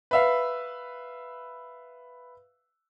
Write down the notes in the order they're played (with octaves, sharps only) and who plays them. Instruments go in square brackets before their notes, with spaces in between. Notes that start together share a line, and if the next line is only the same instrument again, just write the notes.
[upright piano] B4 E5 F5